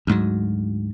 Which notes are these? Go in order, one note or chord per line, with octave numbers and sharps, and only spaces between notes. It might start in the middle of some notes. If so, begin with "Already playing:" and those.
D2 G#2 F#3